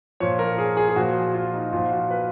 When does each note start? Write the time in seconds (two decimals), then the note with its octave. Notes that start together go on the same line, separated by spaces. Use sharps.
0.20 A#2 F3 C#5
0.39 A#4
0.58 G#4
0.77 G#4
0.89 G#4
0.96 A#2 F3 F#4
1.34 F4
1.54 D#4
1.73 A#2 F3 F4
1.92 F#4
2.11 B4